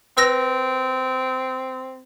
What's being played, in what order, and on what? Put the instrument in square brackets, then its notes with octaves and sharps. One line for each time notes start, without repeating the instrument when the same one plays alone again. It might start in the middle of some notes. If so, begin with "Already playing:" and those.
[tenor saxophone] C4 [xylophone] B4 E6 A#6